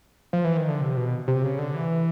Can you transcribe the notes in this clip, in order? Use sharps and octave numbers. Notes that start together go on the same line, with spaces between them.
F3
E3
D#3
D3
C3
B2
C3
C#3
D3
E3